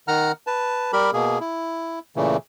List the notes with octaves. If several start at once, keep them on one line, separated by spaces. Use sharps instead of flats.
D#3 F#5 A#5 F6
B4 A5
G3 G4 A#4 B5
B2 A#3 G#4
E4
A#2 C#3 E3 A3